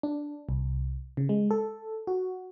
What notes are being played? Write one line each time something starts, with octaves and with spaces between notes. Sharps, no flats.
D4
C2
C#3
G#3
A4
F#4